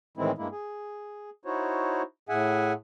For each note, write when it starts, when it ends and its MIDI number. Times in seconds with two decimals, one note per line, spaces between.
0.17 0.31 45
0.17 0.31 51
0.17 0.31 52
0.17 0.31 56
0.17 0.31 60
0.17 0.31 64
0.38 0.48 43
0.38 0.48 56
0.38 0.48 58
0.38 0.48 64
0.52 1.30 68
1.45 2.02 63
1.45 2.02 64
1.45 2.02 66
1.45 2.02 72
1.45 2.02 73
2.29 2.73 45
2.29 2.73 68
2.29 2.73 76
2.29 2.73 78
2.29 2.73 80